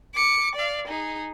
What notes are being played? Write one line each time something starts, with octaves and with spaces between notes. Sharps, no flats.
D6 C#7
D5 F5
D#4 G#4